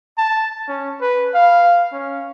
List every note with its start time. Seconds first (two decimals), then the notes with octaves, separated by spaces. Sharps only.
0.18 A5
0.68 C#4
1.01 B4
1.35 F5
1.93 C#4